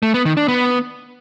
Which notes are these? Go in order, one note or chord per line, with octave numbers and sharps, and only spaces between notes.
A3
B3
D#3
D4
B3